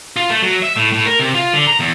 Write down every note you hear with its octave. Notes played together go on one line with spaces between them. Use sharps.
F4
A3
F#3
E5
A2
A2
A#4
C3
F4
D3
A#5
E2